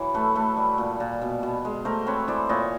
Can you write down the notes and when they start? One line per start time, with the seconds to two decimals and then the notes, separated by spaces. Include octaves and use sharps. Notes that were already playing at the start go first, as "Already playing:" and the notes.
Already playing: E3 F#3
0.14 A3 A4 B4
0.35 A3 A4 B4
0.57 G3
0.78 A#2
1.00 A#2
1.22 B2
1.43 B2
1.65 G#3
1.85 A3 A#4 C5
2.06 C4 B4 C#5
2.28 E3 C5 D5
2.49 A#2 C#5 D#5